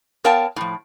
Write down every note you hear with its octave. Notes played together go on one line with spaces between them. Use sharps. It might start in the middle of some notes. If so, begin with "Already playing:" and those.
B3 A#4 C#5 F5 G5 A5
A2 F3